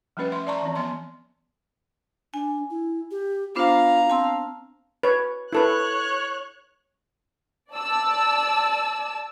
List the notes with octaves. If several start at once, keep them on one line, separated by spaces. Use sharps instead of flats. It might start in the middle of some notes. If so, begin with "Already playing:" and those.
F3 G3 A3 C#4 B4 D#5
E5 C6
D5 E5 A5 A#5 C#6
E3 C4
F3 B3 D#5 C6
D4 G#5
E4
G4
B3 D4 F4 C5 F5 A#5
C4 A5 C6 E6
B4 C#5
E4 A4 B4 C#5 F#6
D5 A5 E6